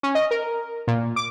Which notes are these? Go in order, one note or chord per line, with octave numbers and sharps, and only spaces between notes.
C#4
D#5
A#4
A#2
D6